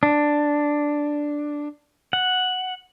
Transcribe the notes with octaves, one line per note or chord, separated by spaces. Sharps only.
D4
F#5